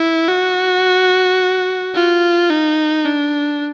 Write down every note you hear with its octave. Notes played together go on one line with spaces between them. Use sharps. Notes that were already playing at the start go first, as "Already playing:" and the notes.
Already playing: E4
F#4
F4
D#4
D4